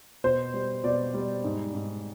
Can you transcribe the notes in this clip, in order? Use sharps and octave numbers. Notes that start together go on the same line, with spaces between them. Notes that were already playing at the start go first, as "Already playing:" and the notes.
B2 C5
G3
B2 D5
G3
G#2
G#2